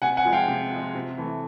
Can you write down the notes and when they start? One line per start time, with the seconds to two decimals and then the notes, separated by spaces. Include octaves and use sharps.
0.02 C3 F#5 G#5
0.17 F#5 G#5
0.25 F3 G#3
0.32 F5 G5
0.48 C3
0.71 F3 G#3
0.95 C3
1.18 E3 A3